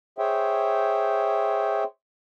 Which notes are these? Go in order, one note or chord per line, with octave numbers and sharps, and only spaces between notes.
G#4 C5 C#5 E5 G5